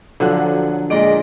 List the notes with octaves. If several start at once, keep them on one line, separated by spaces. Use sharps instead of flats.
D3 F3 F#3 F#5 F#6
A#2 G#3 D5 D#5 D7